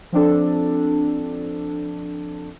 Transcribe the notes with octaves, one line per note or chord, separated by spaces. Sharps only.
F3 C4 D4 A4